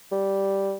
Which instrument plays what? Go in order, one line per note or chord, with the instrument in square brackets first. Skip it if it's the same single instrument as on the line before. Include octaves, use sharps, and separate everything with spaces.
[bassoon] G3